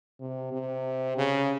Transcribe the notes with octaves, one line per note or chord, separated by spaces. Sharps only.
C3
C3
C#3